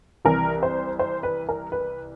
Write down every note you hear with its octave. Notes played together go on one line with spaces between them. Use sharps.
C2 C3 E3 A#4
C5
C5
B4
A#4
B4